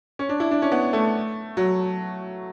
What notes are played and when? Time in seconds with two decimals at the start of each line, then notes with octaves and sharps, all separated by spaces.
0.19 C#4
0.29 D4
0.40 E4
0.51 D4
0.62 C#4
0.72 B3
0.93 A3
1.57 F#3